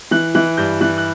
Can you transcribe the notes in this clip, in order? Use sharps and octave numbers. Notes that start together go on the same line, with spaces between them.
E3 F#6
E3 F#6
G2 G6
E3 F#6
F#6